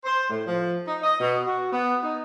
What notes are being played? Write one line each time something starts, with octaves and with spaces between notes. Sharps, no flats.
C5
A2
F3
D#4
D#5
B2
F#4
B3
D#4